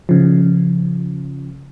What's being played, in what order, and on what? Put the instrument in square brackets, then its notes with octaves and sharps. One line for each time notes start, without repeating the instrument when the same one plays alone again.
[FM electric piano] C#3 F3